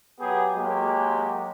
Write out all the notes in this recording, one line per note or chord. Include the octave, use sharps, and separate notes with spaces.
F#3 B3 G4 G#4
F#3 G#3 A#3 G4